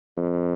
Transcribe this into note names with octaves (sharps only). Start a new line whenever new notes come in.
F2